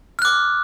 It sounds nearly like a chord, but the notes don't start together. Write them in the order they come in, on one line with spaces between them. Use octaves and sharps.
F6 F#6 D6